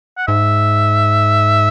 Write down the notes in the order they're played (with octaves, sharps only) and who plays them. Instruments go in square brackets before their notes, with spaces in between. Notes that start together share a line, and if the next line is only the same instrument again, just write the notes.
[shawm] F#5
[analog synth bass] G#2 [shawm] E5